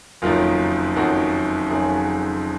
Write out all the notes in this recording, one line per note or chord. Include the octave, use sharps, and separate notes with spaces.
F#1 F2 D#3 F#3 F4
F#1 F2 D#3 F#3 F#4
F#1 F2 D#3 F#3 G#4